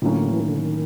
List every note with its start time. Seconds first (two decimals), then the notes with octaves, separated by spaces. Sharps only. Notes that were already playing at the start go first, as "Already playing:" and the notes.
0.02 A2 D3 F#3 A#3 C#4
0.31 E3
0.40 D#3
0.48 D3
0.57 D#3